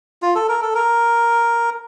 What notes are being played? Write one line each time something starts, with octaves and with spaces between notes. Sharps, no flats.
F4
A4
A#4
A4
A#4